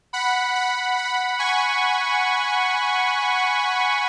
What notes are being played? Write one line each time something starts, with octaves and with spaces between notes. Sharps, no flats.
F#5 B5
F#5 B5
F#5 B5
G#5 C#6